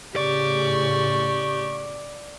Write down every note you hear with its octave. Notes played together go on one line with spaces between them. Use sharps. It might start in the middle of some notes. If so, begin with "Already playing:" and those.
A2 C#3 G4 D5 C#6